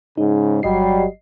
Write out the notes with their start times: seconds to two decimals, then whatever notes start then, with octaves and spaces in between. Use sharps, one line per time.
0.18 G#2 C#3 D#4
0.63 G1 F#3 G3 D#5 C7